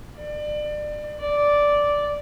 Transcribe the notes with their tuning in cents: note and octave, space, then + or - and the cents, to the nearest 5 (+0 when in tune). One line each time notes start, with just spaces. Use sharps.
D5 +30
D5 -5